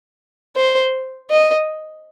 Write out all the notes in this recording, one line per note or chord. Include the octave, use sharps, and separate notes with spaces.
C5
D#5